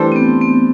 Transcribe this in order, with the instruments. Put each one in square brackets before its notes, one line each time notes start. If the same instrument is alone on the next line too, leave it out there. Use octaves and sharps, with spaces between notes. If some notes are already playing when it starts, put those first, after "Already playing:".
Already playing: [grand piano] E3 G3 D4 A4 C5 [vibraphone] A3
[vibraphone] C4
B3
B3